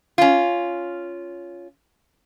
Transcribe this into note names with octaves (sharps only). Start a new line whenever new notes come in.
C#4 F4